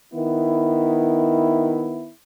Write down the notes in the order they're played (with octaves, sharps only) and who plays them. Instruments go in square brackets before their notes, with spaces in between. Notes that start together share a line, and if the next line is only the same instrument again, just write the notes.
[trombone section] D#3 B3 E4